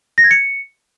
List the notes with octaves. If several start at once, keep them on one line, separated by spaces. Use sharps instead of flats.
A#6
G#6
C#7